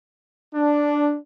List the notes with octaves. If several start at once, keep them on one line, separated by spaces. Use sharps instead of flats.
D4